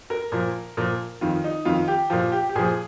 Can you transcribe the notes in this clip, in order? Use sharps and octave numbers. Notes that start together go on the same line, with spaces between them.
A#4
A#2 F3
A#2 F3
F2 D#3 F4
D#4
F2 D#3 F4
G4
A#2 F3 F4
G4
G4
A#2 F3 G#4